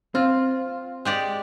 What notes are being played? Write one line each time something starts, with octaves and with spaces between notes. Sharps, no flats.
C4 F4
G#3 G4 D5